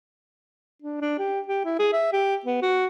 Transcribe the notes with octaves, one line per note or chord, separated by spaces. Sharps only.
D4
D4
G4
G4
E4
G#4
E5
G4
B3
F#4